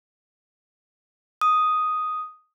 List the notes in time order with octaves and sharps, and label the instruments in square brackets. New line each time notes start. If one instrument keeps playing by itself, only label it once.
[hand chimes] D#6